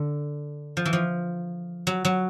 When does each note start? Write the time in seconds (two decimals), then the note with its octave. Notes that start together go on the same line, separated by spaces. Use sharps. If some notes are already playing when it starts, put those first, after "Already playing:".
Already playing: D3
0.77 F3
0.85 E3
0.93 F3
1.87 F#3
2.05 F#3